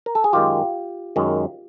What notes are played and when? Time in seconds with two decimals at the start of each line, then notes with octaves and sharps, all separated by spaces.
0.06 A#4
0.15 A4
0.24 G#4
0.33 F#2 D#3 G#3 F4 G4
1.16 F#2 D#3 G#3